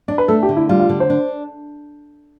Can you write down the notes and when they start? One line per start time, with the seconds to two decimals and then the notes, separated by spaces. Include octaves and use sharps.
0.08 D4 D5
0.18 B4
0.28 A3 A4
0.43 G4
0.49 D3
0.56 E4
0.69 G3 F4
0.80 F4
0.89 D3
1.00 C5
1.10 D4